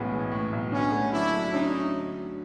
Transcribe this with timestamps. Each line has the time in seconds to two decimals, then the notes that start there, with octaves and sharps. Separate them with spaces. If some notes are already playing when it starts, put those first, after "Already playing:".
Already playing: B1 A2 E3 G#3 B3 C#4
0.12 E3
0.32 A2
0.52 B1
0.72 D3 B3 C#4
0.92 A3
1.12 F#3 D4 E4
1.33 F#3
1.53 D3 C#4 D#4
1.73 D3